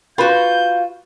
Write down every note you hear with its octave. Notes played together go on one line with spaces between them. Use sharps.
F4 F#4 B4 F5 B5 G6